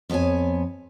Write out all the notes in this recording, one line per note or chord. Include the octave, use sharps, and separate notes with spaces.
F2 B3 G4 C#5 G#5